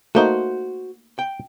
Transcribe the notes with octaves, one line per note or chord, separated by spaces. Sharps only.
A3 A#3 D#4 F#4 C5
G5